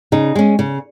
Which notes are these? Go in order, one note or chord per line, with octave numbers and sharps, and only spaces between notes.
C#3 D#4
G#3 C#4
C#3